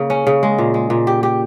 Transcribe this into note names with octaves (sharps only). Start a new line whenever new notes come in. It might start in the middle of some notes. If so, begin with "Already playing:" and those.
Already playing: C#3 A#3
C#4
C#3
G#3
A#2
G#3
A#2
G4
G4